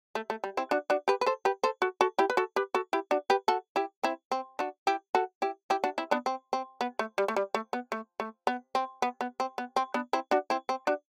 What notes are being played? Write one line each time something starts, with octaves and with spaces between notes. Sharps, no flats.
A3
A3
G3
C4 E4
D4 F#4
D4 F#4
G4 B4
B4
A4 C5
G4 B4
A4 C5
F#4 A4
F#4 A4
E4 G4
B4
F#4 A4
G4 B4
F#4 A4
E4 G4
D4 F#4
G4 B4
F#4 A4
E4 G4
C4 E4
C4
D4 F#4
E4 G4
F#4 A4
E4 G4
E4 G4
D4 F#4
C4 E4
B3 D4
C4
C4
B3
A3
G3
A3
G3
A3
B3
A3
A3
B3
C4
B3
B3
C4
B3
C4
B3 D4
C4 E4
D4 F#4
C4 E4
C4
D4 F#4